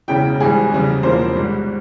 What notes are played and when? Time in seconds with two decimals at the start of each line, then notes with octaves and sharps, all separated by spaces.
0.08 E1 E2 C#3 E3 G5
0.40 G#1 G#2 E3 G3 G#4
0.72 F1 E2 C#3 G3
1.03 E1 E2 C3 F3 A#3 C5
1.35 G#1 G#2 G3